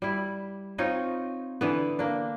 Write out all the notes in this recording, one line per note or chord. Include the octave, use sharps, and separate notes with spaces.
G3 E4
C4 D#4 F4 C#5
D3 E3 B3
A#3 D4